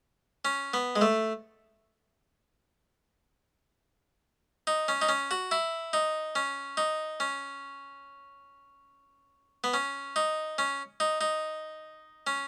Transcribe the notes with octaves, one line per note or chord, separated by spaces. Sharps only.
C#4
B3
G#3
A3
D#4
C#4
D#4
C#4
F#4
E4
D#4
C#4
D#4
C#4
B3
C#4
D#4
C#4
D#4
D#4
C#4